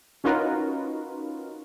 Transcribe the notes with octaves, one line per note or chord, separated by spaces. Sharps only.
C#4 D#4 F4 F#4 A#4 B4